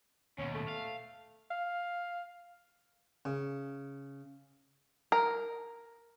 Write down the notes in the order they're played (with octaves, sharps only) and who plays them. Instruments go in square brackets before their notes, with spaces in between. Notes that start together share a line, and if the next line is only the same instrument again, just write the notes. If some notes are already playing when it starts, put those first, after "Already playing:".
[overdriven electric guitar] D#2 B2 [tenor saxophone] C#4
[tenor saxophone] A3
[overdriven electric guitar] F5
[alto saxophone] F5
[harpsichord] C#3
[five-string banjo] A#4